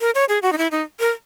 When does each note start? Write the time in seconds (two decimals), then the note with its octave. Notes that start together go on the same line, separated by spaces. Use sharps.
0.01 A#4
0.15 C#5
0.29 G#4
0.42 F#4
0.52 D#4
0.58 E4
0.71 D#4
1.00 A#4